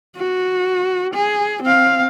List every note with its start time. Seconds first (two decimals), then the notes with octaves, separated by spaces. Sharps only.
0.16 F#4
1.14 G#4
1.63 C4 F5